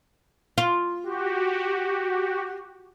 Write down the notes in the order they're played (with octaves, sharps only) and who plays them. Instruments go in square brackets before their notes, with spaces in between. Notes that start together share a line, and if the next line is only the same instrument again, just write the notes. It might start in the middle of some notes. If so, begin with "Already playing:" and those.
[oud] F4
[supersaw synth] F#4 G4